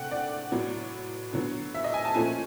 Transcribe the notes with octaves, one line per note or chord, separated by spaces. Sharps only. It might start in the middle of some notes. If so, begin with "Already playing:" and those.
Already playing: C3 A3 D4 F#5 G5
D5
A2 F#3 B3
D3 F#3 B3
E5
D#5
G#5
A5
A#2 F3 A3 C#4 G#5